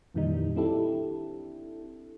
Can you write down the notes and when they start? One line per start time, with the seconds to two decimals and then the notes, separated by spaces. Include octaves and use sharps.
0.14 F2 A#2 D#3 E3 G3 D#4
0.56 C4 D4 E4 G4 A4